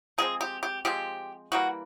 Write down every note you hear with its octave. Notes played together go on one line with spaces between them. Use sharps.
F3 G#3 C4 G#4
G4
G4
F3 G#3 C4 G4
E3 G3 A#3 F#4